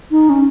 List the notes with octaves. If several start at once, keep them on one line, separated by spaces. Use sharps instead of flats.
D#4
C#4